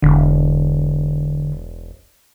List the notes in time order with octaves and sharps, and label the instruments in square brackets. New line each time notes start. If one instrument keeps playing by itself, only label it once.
[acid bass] E1 [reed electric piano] D3